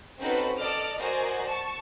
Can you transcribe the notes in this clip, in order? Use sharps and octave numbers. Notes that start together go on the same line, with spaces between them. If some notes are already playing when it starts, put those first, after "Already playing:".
C4 C#4 D#4 F#4 A4 B4
A4 D5 D#5 D6 F6
F#4 A#4 C5 D5 D#5 G#5
A5 C#6